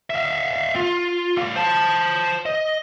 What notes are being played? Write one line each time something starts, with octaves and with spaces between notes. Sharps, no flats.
E5 F5
F4
G3 F5
C5 A5
D#5